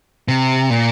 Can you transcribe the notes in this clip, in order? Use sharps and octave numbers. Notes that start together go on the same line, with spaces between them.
C3
A#2